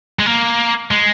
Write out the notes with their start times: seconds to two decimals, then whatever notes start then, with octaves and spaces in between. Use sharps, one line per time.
0.19 G#3
0.26 A#3
0.91 G#3